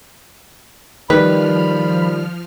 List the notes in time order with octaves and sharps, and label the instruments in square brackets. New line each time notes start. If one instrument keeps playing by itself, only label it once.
[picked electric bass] D#3 G3 [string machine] F3 F6 [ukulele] B4 [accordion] B5